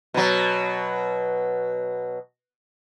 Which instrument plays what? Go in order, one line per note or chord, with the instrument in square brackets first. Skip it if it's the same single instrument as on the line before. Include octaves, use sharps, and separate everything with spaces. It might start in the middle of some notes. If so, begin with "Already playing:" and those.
[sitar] B2 F#3